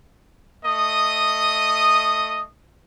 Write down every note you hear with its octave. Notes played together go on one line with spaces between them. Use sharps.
A3 D#5 D#6